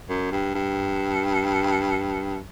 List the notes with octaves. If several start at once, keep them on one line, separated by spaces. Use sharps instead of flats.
F#2
G2
G2